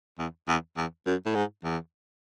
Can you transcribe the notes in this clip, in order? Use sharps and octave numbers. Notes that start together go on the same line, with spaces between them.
E2
E2
E2
F#2
A2
G#2
E2